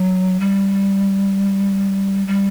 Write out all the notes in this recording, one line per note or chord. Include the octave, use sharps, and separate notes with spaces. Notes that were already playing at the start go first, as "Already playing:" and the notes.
Already playing: F#3
G3
G3